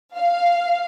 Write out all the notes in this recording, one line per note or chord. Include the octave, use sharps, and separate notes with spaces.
F5